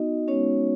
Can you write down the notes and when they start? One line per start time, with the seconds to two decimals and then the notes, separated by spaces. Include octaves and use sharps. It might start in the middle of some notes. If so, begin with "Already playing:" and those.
Already playing: B3 D#4 F#4 D#5
0.28 G#3 B3 C#4 D#4 F#4 C#5